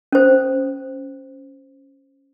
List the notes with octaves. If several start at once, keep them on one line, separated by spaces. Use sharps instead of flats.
C#4 C5